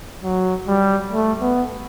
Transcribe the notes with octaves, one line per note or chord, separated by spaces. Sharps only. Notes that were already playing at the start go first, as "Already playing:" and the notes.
F#3
G3
A3
B3